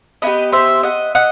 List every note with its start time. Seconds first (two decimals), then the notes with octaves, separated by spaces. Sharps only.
0.22 B3 E4 B4 D#5
0.27 G4
0.53 C5 E5
0.83 D#5 F#5
1.15 D#5 F#5